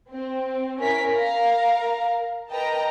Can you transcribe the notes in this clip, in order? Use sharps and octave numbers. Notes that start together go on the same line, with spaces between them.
C4
C#4 E4 A#4 B6
A#4 F5 A#5
A#4 B4 D#5 G5 A5 A#5